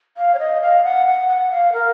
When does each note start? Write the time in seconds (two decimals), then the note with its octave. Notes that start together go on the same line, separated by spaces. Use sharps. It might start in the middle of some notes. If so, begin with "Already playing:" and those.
0.17 F5
0.34 C#5
0.39 D#5
0.62 F5
0.84 F#5
1.06 F#5
1.29 F#5
1.51 F5
1.73 A#4